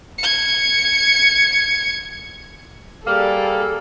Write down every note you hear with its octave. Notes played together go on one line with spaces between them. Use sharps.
G#6 C#7
G3 A#3 G#4 A4